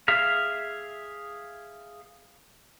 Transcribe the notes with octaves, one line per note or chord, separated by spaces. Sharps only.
G#4 E5 F5